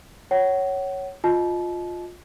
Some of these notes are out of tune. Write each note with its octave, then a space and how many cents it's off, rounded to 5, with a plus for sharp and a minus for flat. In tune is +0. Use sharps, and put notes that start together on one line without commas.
C#5 +0 F#5 +30
F4 +15 D#5 +0 A5 -30